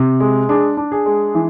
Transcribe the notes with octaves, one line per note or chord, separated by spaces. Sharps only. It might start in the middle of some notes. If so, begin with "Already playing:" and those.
Already playing: C3
G#3
D4 G#4
D4
G#4
G#3
E3